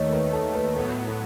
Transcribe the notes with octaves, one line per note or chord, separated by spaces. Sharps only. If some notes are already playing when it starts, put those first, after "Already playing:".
Already playing: D#2 D#3 A3 C#5 D#5
B4
A4
B4
A2 F#3 B3 A4
A4